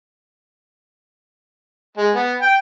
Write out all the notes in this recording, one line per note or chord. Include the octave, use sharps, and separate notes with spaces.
G#3
B3
G5